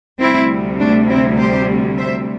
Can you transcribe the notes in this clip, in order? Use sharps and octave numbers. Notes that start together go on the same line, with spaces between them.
D2 C3 G3 C4 E4
A3 D4
C4 E4
G4 C5
C5 E5